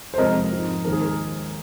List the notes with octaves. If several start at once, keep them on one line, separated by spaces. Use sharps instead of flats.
C5
F2 C3 G#3 C4 A#4 D#5
G#2 F3 C4
D#2 D#3 G#3 C4 A#4
G#4
A#4